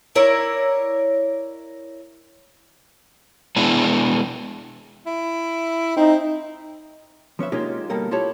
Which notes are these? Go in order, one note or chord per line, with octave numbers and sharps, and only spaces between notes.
E4 A#4 C#5 D5
G#3 B3 D4 E4 G#4
E4
C4 D#4
F3 C#4 B4 E5
G#3 A#3 C#4 D#4 F4 G4
B2 D3 G3 A#3 A4 A#4
E4 F4 G4 A4 C#5 A5